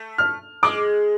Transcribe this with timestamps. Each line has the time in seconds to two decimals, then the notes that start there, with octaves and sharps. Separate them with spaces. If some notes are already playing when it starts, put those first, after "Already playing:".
Already playing: A3
0.18 F6
0.63 G#3 D6